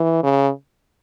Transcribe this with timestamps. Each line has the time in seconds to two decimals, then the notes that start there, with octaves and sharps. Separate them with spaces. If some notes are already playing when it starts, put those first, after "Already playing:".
Already playing: E3
0.23 C#3